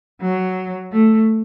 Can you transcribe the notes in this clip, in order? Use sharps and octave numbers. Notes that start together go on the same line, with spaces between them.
F#3
A3